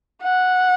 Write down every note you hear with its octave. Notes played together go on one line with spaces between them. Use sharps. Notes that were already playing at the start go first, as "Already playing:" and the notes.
F#5